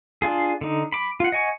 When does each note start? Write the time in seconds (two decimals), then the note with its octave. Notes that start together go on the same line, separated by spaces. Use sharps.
0.22 D4 F4 G#4
0.61 D3 D#4
0.92 B5 D6
1.20 F4 F#5
1.32 D#5 F#5 G#5 C#6